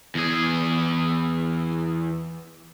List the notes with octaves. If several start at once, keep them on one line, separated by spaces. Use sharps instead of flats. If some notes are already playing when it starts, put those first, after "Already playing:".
E2 G#4